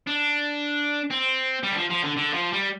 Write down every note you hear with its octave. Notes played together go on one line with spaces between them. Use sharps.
D4
C4
G3
D3
F3
F3
D3
D3
F3
G3